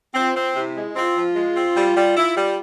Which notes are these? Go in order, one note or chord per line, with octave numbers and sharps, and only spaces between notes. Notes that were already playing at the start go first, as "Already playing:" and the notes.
C4 F4
C4
C3 E4
G#3
C4 F4
F3
G#3
C4
G3
G3
E4
G3